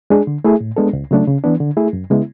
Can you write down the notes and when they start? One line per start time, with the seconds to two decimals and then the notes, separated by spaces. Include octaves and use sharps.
0.10 G#3 D4 G#4
0.27 D3
0.44 A3 E4 G#4
0.61 A2
0.77 G#3 B3 D4 A4
0.93 C#2
1.11 C#3 F#3 A3 D4
1.27 C#3
1.44 E3 B3 D4
1.60 D3
1.77 A3 E4 G#4
1.93 F#2
2.10 C#3 G#3 B3 E4